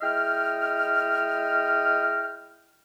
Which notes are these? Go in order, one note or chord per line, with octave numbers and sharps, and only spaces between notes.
G#3 E4 D#5 G5 F6